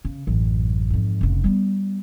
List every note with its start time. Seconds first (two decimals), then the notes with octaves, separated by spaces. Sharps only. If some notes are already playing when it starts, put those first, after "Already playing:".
0.05 C#3
0.27 A1 F#2
0.90 F2 G#2
1.21 F1 C#3
1.44 G3 B3